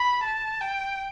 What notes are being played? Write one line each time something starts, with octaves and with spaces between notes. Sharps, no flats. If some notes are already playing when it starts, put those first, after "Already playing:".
Already playing: B5
A5
G5